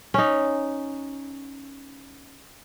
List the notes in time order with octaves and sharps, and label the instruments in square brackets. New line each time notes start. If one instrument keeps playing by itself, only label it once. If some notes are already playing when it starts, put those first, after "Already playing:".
[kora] C#4 D#4